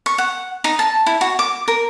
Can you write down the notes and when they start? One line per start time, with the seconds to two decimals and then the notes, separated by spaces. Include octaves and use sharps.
0.06 C#6
0.18 F#5
0.64 D#4
0.79 A5
1.06 E4
1.21 F#4
1.39 D6
1.68 A#4